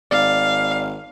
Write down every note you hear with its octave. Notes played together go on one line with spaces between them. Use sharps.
G#1 D5 F5